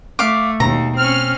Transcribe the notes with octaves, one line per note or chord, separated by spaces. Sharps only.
A3 F5 D6
D#2 B2 A#5
C4 C#4 F6